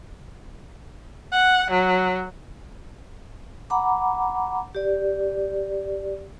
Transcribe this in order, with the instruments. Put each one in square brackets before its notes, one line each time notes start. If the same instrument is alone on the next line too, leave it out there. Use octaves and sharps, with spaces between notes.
[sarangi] F#5
F#3
[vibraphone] F#5 A#5 B5 D6
G4 D5